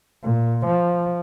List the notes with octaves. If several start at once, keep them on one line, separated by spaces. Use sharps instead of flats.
A#2
F3